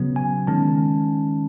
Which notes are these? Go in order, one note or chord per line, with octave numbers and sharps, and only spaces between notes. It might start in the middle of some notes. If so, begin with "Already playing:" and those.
Already playing: C#3 F#3 B3
G#5
D#3 G#3 C#4 A5